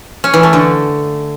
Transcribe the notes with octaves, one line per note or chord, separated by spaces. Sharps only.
C#4
E3
A3
D3